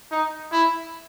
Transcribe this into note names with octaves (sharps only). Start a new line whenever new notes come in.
D#4
E4